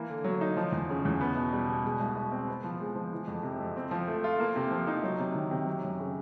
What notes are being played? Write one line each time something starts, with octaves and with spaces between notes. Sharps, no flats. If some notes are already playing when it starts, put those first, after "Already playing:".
Already playing: E3 A#3
D3
F#3
D#4
F3
E2
C#3
E2
B3
B2
G3
B2
G#3
C2
B2
C4
B3
F3
G#3
F3
E3
F2
C3
F2
C4
F3
A3
F4
A#3
C3
F3
D#4
F#3
C3
D#3
C3
F#3
F#2
C#3